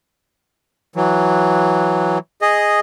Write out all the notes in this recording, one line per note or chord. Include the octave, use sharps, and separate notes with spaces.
E3 F#3
G#4 D#5